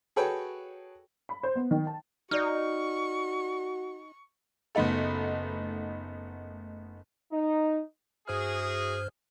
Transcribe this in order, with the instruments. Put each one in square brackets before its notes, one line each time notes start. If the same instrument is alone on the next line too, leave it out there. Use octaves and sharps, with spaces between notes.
[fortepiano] F#4 G#4 A4 B4 C#5 G5
[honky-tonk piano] B5
C5
B3
D#3
A5
[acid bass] D#4 [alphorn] F#4 [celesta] D5 F6 [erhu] C#6
[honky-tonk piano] F#1 A3 B3 D#4 A4
[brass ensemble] D#4
[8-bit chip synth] G2 C5 F6 [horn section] E4 F#4 G#4